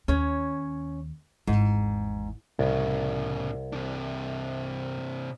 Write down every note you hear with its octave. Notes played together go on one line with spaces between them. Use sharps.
D#2 C#4 C#5
G#1 E2 G#2
C2 A2 C#3
C3 D4